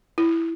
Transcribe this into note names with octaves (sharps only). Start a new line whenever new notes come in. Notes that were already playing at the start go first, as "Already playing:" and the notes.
E4